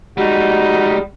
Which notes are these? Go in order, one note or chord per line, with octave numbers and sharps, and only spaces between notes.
G3 G#3 D#4 F#4